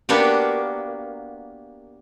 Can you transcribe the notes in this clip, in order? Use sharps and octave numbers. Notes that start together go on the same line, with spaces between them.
A#3 B3 D4 F#4 G4